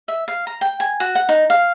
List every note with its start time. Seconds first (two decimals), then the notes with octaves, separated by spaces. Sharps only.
0.08 E5
0.28 F5
0.47 A#5
0.61 G5
0.80 G#5
1.00 F#4
1.15 F#5
1.29 D#4
1.50 F5